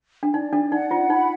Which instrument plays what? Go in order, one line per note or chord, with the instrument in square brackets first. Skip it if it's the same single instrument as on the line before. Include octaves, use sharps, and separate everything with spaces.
[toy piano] D4
[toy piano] D#4 [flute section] D5
[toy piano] D4
[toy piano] D#4 [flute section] F#5
[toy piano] F4
[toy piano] D#4 [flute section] B5